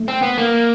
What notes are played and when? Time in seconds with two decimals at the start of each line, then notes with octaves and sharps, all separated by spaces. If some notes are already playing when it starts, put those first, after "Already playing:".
Already playing: A3
0.08 C4
0.22 B3
0.38 A#3